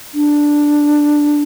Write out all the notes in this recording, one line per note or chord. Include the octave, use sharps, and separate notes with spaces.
D4